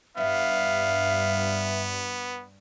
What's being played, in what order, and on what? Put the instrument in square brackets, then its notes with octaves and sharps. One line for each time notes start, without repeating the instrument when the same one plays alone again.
[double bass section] G2 [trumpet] B3 [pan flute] E5 [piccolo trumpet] F5